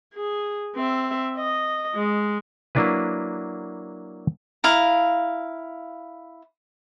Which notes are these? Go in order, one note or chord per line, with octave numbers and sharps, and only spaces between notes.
G#4
C4 E5
D#5
G#3
F#3 A#3 D4 E4 B4
E4 F5 A#5